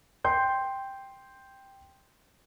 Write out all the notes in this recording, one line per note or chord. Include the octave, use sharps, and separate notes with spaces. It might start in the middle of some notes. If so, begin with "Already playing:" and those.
G5 C6 G6